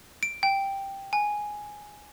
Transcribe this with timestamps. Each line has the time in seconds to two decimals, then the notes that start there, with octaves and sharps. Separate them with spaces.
0.23 D7
0.43 G5
1.13 G#5